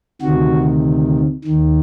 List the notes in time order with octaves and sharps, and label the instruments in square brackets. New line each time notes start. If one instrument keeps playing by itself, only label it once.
[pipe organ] D2 C3 D#3 F#4
D#2 D#3